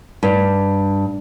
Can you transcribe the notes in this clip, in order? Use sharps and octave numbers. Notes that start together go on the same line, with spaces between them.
G2